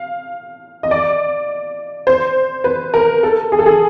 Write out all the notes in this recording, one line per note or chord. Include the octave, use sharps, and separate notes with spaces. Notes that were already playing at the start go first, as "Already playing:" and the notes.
Already playing: F5
D#5
D5
C5
B4
A#4
A4
G#4
A4
G#4